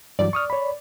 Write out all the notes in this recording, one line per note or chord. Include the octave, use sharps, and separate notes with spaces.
G2 E3 F#3 D5
C#6 D#6 F6
C#5 B5